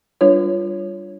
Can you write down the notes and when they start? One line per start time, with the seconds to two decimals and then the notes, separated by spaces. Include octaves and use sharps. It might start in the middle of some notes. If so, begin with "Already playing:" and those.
0.21 G3 D4 F4 B4 C#5